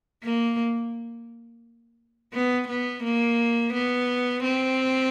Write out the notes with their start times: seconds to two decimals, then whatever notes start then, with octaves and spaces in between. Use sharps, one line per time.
0.23 A#3
2.33 B3
2.69 B3
3.03 A#3
3.73 B3
4.43 C4